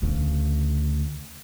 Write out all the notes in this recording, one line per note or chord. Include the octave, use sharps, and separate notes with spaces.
D2 C#3